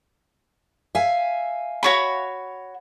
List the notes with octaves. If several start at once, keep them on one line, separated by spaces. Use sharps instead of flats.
E5 F5 G#5
F#4 C#5 B5